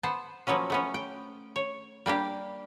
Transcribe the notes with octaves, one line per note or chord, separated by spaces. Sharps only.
B3 C5 A5
F3 F#3 A#3 B3 C#4
A3 B3 C#4
G5
C#5
G3 A#3 D4 G4